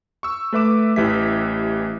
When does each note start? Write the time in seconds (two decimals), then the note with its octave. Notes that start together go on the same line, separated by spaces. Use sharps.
0.23 C#6 E6
0.53 A3 B4 E5 D6 E7
0.96 A1 E3 G4 E5 B6